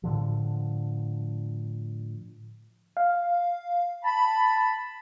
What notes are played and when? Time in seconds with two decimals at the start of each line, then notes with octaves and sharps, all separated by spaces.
0.03 A2 D3 F3
2.97 F5
4.03 A5 B5